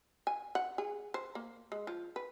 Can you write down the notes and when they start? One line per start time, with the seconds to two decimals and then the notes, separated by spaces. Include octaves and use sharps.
0.27 G#5
0.55 F#5
0.78 G#4
1.14 C5
1.35 A#3
1.72 G#3
1.87 F3
2.16 B4